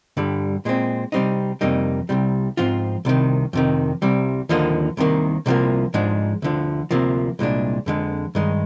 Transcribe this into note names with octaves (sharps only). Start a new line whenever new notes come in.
G2 D3 G3
A#2 G#3 C4
C3 G3 C4 D#4
F2 C3 G3 A#3 D#4
C2 C3 G3
G#2 F3 C4 F4
C2 C3 D#3
F2 C3 D#3
C2 C3 G3
D#2 D3 F3 A#3 D#4
C2 C3 D#3 A#3
C2 C3 F3 A#3
G#2 F3 G#3 D4
D2 D3 F3
D2 C3 F3 A#3
C2 A#2 G#3 D4
F2 D3 G#3
G2 D#3 G#3 D#4